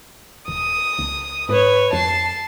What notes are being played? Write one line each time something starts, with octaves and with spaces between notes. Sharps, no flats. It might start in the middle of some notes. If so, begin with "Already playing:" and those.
D#1 D#6
C#2
G#2 B4 C#5
F2 A5 C7